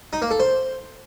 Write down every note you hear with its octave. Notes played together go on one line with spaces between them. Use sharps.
D#4
A#3
A4
C5